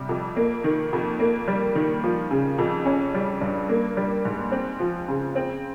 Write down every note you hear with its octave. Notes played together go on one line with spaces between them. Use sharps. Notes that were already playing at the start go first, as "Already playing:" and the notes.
Already playing: C3 G3
F2
A#3
D#3
F2
A#3
G3
D#3
F3
C#3
F2
C#4
G3
G2
A#3
G3
G#2
C4
F3
C#3
C4